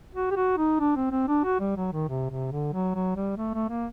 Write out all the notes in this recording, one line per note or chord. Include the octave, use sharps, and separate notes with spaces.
F#4
G4
F#4
D#4
D4
C4
C4
D4
F#4
G3
F#3
D#3
C3
C3
D3
F#3
F#3
G3
A3
A3
A#3